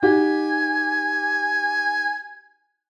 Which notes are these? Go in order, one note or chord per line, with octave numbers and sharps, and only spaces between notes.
D#4 F#4 G4 G#5